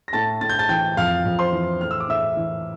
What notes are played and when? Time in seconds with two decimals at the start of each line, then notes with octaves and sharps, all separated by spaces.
0.08 A#6
0.13 A2 A5 A6
0.41 A2 A6
0.49 G6
0.59 A5 A6
0.69 E3 G5 G6
0.97 F2 F5 F6
1.25 F2
1.39 C5 C6
1.53 E3
1.81 A2 F6
1.91 E6
2.00 D6
2.08 A2 E5 E6
2.37 E3